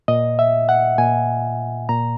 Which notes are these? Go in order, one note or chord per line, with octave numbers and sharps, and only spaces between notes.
A#2 D#5
E5
F#5
A#2 G#5
A#2 A#5